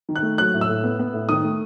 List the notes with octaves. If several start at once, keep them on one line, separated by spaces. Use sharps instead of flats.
D#3
F#6
A3
F#3 F#6
A2
E6
A2
B3
B3
A2
D#3 D#6
A3